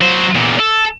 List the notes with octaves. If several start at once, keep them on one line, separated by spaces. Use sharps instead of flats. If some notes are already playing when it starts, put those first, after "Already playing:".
F#3 C5
E2 A#2
A4